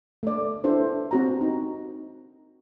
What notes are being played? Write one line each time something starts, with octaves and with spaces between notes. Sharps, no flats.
A3 D5
D4 E4 A4 C5
C4 F#4 A#5
D#4